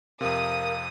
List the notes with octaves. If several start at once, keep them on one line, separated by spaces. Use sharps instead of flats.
F2 C3 A#3 A#4 D#6